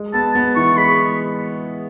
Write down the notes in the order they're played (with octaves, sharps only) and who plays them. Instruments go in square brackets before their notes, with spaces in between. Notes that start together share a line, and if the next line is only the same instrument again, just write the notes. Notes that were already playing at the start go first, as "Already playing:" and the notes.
Already playing: [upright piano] G#3
[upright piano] B3 [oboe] A5
[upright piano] B3
[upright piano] E3 [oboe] C#6
[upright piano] G#3 [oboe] B5